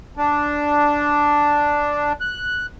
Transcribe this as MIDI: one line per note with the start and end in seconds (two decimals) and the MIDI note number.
0.17 2.13 62
2.21 2.66 90